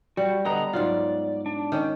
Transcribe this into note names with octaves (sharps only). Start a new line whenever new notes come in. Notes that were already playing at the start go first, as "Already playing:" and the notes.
G3 F#4
D3 B3 D#5 A#5
G#2 F#3 F4 D5
D4
D#3 C#4